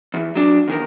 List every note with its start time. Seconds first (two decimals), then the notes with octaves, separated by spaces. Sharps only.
0.14 E2 E3
0.35 F#3 D4
0.68 E2 D#3 A#4